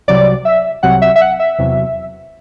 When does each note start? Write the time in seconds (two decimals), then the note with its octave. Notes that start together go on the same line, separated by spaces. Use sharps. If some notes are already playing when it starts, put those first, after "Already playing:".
0.08 C2 C3 F#3 D5
0.45 E5
0.83 C2 C3 F#3 F#5
1.02 E5
1.16 E5
1.21 F#5
1.39 E5
1.59 E2 C3 F#3